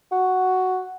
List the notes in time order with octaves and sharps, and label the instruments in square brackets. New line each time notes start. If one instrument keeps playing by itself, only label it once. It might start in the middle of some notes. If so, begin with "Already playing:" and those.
[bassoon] F#4